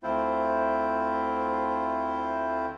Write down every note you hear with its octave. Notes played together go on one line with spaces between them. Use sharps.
D2 A3 C4 E4 F4 C5